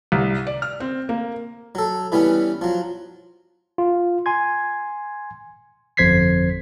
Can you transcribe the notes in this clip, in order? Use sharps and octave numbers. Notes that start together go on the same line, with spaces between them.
C2
D5
F6
C4
A#3
F#3 A4
E3 G3 B3 C#4
F3 F#3
F4
G#5 C6 G#6
G1 F2 C5 G#6 B6 C7